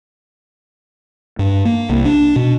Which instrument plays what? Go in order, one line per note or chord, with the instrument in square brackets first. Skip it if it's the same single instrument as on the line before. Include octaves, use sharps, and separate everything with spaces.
[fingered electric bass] G2
A#3
C2
D4
B2